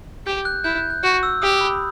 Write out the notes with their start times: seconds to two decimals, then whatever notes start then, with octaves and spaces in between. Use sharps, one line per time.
0.26 G4 G6
0.45 F#6
0.64 E4 G6
0.78 F#6
0.90 F#6
1.03 F#4 F#6
1.23 E6
1.42 G4 D#6
1.61 B5